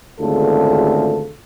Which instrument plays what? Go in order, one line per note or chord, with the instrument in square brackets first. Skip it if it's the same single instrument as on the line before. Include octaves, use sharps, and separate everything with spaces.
[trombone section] G#1 D2 C#3 F4 A4